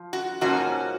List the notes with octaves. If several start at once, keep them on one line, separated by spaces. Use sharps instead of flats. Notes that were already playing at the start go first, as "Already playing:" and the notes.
Already playing: F3
F#4
G#2 F3 A#3 C#4 F#4